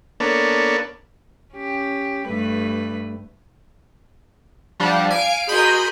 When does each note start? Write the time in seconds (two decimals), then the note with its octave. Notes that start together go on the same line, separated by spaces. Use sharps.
0.20 A#3 B3 D4 A4 C#5
1.55 C#4 G4
2.27 G2 A3 B4
4.80 F3 G3 D4 F5 F#5
5.11 F5 G#5 D7
5.49 F#4 G#4 A#4 D#5 B5 C6 G6